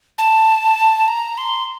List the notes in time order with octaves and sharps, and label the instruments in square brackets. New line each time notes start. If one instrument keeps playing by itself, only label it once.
[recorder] A5
A#5
C6